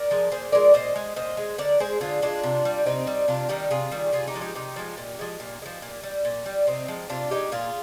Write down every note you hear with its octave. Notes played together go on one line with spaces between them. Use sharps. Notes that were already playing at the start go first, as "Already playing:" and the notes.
Already playing: A#4 D5
F3 G#3
A#2 G#4 C5
F3 G#3 A#4 D5
A#2 C5 D#5
G#3
A#2 C5 D#5
G#3
D3 A#4 D5
G#3 G#4 C5
D3 F4 G#4
G#3 D4 F4
C3
G3
C3 C4 D#4
G3
C3 D4 F4
D#3 G3 D#4 G4
C3 F4 G#4
D#3 G3
C3 F4 G#4
D#4 G4
F3 G#3
D#4 G4
C3 D#4 G4
F3 G#3
A#2
F3 G#3
A#2
G#3
F3
A#2
G3
A#2
G3
C3 C4 D#4
F3 G#3
C3 D4 F4
F3 G#3 D#4 G4
A#2 F4 G#4